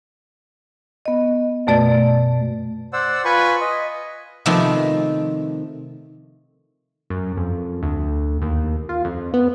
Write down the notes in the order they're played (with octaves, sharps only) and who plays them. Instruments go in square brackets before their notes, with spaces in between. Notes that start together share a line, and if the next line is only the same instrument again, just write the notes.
[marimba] B3 D#5
F#2 B2 A3 D5 A6
[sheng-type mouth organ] C5 D5 F#5 E6
F4 B4 G#5 B5 C#6
D#5
[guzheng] C3 D#3 F3 A3 B3 C4
[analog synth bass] F#2
F2
D2
D#2
F4
F2
B3